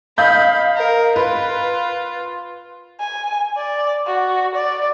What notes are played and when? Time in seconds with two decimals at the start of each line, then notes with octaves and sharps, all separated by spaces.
0.18 D#5 F5 B5 G6
0.76 A#4
1.16 F4 B4
3.00 G#5
3.57 D5
4.07 F#4
4.55 D5